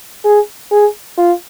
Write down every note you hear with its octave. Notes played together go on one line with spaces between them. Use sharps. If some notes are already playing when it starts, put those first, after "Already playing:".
G#4
G#4
F4